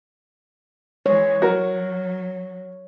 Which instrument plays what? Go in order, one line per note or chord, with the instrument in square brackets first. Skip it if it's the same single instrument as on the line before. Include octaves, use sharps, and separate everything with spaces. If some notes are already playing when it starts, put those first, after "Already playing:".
[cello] E3 G#3 [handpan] C#5
[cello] F#3 [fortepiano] F#4 A#4